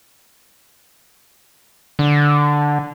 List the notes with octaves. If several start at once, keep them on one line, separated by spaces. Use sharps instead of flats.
D3